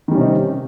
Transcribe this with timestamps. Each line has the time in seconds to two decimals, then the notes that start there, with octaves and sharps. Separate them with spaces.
0.08 D#3
0.11 G3
0.15 C#4
0.18 C3
0.21 D#4